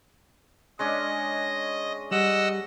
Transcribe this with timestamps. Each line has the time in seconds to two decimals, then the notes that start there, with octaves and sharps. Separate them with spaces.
0.79 G#3 C#4 D4 D#5
2.11 G3 D#5 F#5 E6